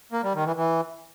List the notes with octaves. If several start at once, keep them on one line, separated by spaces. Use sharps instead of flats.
A#3
G3
D#3
E3
E3